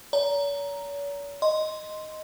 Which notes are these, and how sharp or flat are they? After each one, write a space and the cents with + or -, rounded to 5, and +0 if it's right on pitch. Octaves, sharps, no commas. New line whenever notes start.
C#5 +45 A#5 +0
D#5 +0 C6 +0